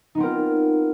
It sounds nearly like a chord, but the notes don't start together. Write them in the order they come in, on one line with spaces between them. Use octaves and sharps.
D#4 B3 C4 A#4 F4